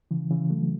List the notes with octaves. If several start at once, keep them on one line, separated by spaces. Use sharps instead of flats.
C#3 E3
C#3 E3
F#3 A3